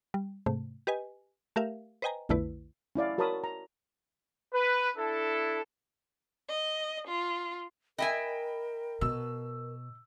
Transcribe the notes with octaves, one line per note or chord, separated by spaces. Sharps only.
G3
G#2 C3 A3
G4 B4 D#5 G#5
A3 G4 A#4 E5 F5
B4 C5 D#5 G5 G#5 A#5
B1 F2 D3 A3 E4 B4
C#4 E4 D5 F5
F#4 A#4 C#5 A5 B5 D#6
A#5
B4
D4 E4 A4
D#5
F4
A#4 D#5 E5 G5 G#5 B5
B2 E6